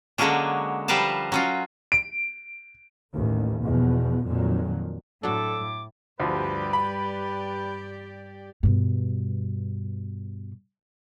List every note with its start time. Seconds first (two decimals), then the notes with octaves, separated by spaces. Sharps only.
0.18 D3 F#3 G#3 A#3 C#4 D4
0.88 F3 G3 A#4 B4 F5 A5
1.32 F#3 C#4 F4
1.92 D7
3.14 A1 D#2
3.63 E2 B2 F3
4.26 F2 A#2 D#3 F#3
5.23 A2 F#3 D4 A4 D6
6.20 D2 G2 F3 G4 B4 D5
6.73 B5
8.63 G2 B2